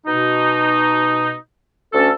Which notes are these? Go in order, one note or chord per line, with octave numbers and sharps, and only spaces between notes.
B2 D#4
D2 C#4 A4